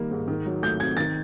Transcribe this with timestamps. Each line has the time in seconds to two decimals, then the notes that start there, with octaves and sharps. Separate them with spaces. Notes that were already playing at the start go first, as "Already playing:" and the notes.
Already playing: D#3 G3 A#3
0.11 G#2
0.28 D#3
0.45 F#3
0.62 A3 G6
0.79 C3 G#6
0.97 D#3 A6